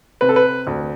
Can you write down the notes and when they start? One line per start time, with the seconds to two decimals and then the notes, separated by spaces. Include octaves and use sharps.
0.21 C3 B4
0.29 A4
0.36 B4
0.67 D2